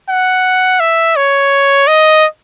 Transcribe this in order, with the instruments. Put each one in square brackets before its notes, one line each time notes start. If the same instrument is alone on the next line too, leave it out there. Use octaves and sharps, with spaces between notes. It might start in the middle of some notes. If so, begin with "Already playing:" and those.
[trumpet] F#5
E5
C#5
D#5